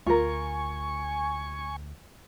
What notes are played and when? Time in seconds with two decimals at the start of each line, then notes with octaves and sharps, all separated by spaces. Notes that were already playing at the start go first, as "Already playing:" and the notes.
0.07 D2 F4 A#4 G#5 C#6